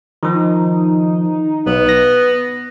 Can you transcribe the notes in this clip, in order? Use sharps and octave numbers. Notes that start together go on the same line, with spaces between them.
D#3 F3 D#4
B1 B3
A#6